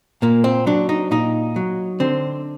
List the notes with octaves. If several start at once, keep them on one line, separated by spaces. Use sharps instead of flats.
A#2 A#3
C4
F#3 D4
D#4
A#2 D#4
F#3
D3 C4